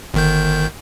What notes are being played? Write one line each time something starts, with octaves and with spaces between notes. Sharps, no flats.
G1 D#3 G6